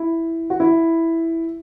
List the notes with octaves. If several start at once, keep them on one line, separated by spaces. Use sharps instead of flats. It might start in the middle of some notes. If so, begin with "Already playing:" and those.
Already playing: E4
F#4
E4